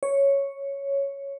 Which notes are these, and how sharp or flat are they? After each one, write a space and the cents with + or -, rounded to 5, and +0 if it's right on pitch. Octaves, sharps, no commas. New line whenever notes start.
C#5 +0